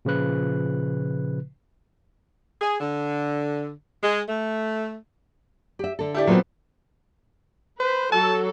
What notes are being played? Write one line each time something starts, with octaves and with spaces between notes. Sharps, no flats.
A#2 C#3 F3 B4 F#6
G#4
D3
G#3
A3
G4 E5
D3 A4
E4 G4 D5
A#2 F#3 B3 C4 A4
B4 C5
F#3 A4 A5